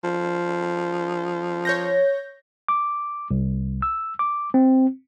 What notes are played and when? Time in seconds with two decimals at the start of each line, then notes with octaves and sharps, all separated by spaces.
0.04 F3
1.65 C#5 G6 A#6
2.68 D6
3.31 C2
3.82 E6
4.19 D6
4.54 C4